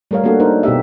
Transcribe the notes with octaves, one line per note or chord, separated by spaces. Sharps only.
G3 A3 A#4 C#5 F5
A#3 B3 D4 F#4 A4
D4 D#4 A#4 C5
B2 B3 G4 E5